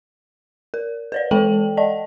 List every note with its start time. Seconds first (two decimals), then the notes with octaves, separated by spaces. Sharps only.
0.74 A#4
1.12 B4 C#5 D5
1.31 E3 G#3 A4 G5 A5 F#7
1.77 D5 D#5 A5